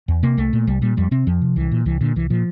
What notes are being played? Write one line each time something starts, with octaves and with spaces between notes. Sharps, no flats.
E2
C3 A#3
C2 A3
A#2
C2 G3
A#2 G3
F2 G3
C3 C4
F2 F3
C3
C2 E3
A#2
C2 E3
A#2 D3
C2 E3
A#2 F3